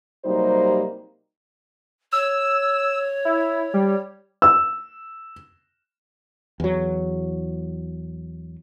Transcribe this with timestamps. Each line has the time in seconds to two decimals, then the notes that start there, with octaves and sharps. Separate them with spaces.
0.25 C3 F#3 G3 A#3 D#4 C5
2.13 C#5 E6
3.25 E4
3.74 G3
4.42 E6
6.60 E2 F#3